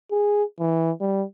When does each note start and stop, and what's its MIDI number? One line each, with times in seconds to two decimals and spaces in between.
0.11 0.44 68
0.60 0.91 52
1.01 1.24 55